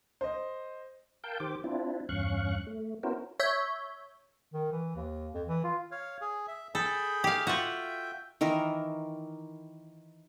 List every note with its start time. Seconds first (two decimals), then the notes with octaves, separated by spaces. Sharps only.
0.21 C5 D#5
1.24 A#4 F5 G5 A5 G6
1.40 D#3 G4 C5 D6
1.64 C4 D4 E4 F4
2.09 E2 G2 C#4 F5 C#6 F#6
2.67 A3
3.03 B3 C#4 E4 F#4 A#4 C5
3.40 C#5 E5 G6
4.53 D#3
4.72 E3
4.96 D#2
5.34 F2
5.47 E3
5.64 F4
5.91 C#5 F5
6.21 G#4
6.48 E5
6.75 G#4 A4 G5 B5
7.24 G4 F5
7.47 F4 F#4 E5 G5
8.41 D#3 E3 A#4